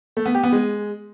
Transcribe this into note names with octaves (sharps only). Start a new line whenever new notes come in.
A3
B3
G4
B3
G#3